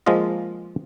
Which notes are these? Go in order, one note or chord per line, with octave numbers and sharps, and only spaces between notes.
F3 G#3 A#3 F4 D#5